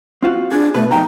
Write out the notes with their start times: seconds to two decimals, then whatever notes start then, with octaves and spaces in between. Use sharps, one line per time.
0.22 C4 F4 F#4
0.52 D4 G#4
0.74 B2 A3 B4
0.91 F2 D#4 G5 A#5